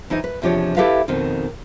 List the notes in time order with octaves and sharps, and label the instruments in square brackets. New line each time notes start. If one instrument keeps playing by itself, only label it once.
[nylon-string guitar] E3 D#4 C5 D#5
B4
E2 C3 F3 D4 G4 C#5
E4 G4 A4 B4 E5 F5
F2 B2 D#3 C4